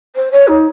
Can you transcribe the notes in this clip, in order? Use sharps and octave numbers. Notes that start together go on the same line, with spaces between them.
C5
C#5
D#4